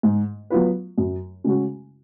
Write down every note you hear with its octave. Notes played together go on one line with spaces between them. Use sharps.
G#2
F#3 B3 F4 B4
F#2
C#3 G#3 C#4 F#4